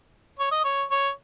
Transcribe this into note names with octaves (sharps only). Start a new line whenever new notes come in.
C#5
D#5
C#5
C#5